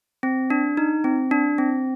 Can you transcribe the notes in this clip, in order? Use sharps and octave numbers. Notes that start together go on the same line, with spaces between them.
C4
D4
D#4
C4
D4
C4